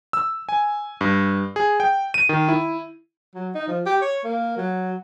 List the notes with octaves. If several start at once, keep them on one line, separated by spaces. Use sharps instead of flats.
E6
G#5
G2
G#4
G5
D#7
D#3
E4
F#3
D#4
F3
G4
C#5
A#3
F#3